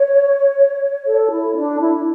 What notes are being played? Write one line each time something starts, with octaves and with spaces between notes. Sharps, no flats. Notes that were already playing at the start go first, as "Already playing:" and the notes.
Already playing: C#5
A4
E4
D4
E4